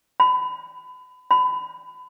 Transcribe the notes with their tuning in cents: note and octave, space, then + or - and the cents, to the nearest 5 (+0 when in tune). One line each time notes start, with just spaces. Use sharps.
B5 +30
B5 +30